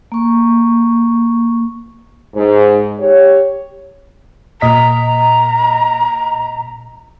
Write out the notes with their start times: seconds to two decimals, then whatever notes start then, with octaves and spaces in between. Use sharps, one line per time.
0.12 A#3 C#6
2.35 G#2
2.99 G4 C#5
4.61 A#2 D#5 A#5 B6